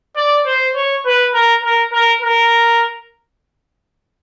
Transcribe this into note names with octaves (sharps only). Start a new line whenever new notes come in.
D5
C5
C#5
B4
A#4
A#4
A#4
A#4